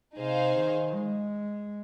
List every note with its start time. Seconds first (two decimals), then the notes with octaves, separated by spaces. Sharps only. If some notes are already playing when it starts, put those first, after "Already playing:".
0.17 C3 D#4 G#4 C5 F5
0.55 D#3
0.94 G#3